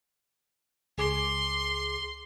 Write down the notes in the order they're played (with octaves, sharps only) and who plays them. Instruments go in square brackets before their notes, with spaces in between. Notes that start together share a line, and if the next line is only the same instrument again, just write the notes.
[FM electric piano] C#2 G#4 D6 [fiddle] C6